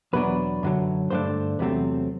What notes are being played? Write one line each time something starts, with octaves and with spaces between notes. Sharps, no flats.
E2 B2 F#3 B3 D4 B4
F#2 D3 F#3
G2 D3 A3 D4 C5
E2 C3 F#3 A3 C4